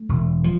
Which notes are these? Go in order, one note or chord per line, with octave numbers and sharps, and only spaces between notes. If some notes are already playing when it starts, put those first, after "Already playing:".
Already playing: A3
E1
F3